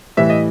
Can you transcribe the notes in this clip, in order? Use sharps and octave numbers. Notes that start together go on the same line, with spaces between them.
A2 E3 G3 E5
D#5